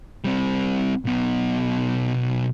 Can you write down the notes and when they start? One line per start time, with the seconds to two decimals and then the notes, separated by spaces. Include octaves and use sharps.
0.24 G3 C4
1.05 B1 B2